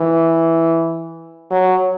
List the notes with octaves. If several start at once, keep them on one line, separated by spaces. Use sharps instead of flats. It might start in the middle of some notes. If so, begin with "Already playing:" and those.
Already playing: E3
F#3